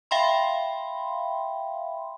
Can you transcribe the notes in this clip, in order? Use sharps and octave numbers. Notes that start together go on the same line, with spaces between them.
E5 F5 G5 B5 C6